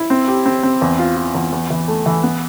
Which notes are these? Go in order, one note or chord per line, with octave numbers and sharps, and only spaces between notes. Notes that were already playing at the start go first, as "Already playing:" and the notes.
Already playing: E4
C4
G4
C4
C4
E2
F4
F4
E2
E2
E3
A3
E3
B3